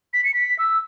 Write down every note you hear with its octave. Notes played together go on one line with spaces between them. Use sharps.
B6
C#7
B6
E6